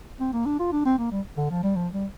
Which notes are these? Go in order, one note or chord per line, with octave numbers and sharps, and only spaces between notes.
C4
A#3
D4
F4
D4
C4
A#3
G3
D3
F3
G3
F3
G3